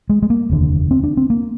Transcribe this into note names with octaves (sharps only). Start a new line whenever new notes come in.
G#3
G#3
A#3
F1 D#2 D3
C4
D4
C4
A#3